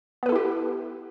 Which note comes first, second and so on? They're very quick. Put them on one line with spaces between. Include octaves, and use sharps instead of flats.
B3 B4 A4 E4 G4